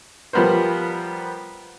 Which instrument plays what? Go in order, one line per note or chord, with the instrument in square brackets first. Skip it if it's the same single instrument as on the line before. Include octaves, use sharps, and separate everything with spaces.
[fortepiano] F3 G3 B3 A#4 C5